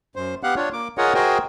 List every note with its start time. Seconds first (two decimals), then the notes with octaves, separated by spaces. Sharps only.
0.16 F#2 C5
0.43 B3 G4 F5 F#5 F#6
0.56 D4 F4 C#5
0.73 A#3 D6
0.98 F4 G#4 A#4 C#5 D#5 F#5
1.14 F#4 G#4 A#4 C5 D#5 G5